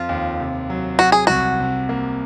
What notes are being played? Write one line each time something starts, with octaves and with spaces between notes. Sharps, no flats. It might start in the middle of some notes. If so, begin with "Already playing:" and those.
Already playing: F2 F3 F4
D#2
C3
F#3
F#3 F#4
G#4
C2 F#4
C3
A#3